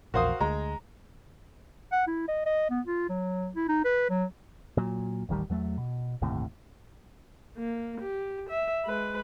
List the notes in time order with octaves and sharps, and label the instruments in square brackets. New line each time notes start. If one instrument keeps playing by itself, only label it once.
[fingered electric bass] A#1 E2 [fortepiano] F#4 C5 D#6 [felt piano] A#4 F5
[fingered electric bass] D2 [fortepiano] G#3 [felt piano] A#5
[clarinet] F#5
E4
D#5
D#5
B3
F4
F#3
E4
D#4
B4
F#3
[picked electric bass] A#2 F#3
D#1 A1 D#3 G3
E2 F#3 A3
B2
G1 D#2 A2 C3
[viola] A#3
G4
E5
G#3 B4